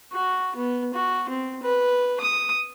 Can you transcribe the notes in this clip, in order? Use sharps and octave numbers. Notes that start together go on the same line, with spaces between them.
F#4
B3
F#4
C4
B4
D#6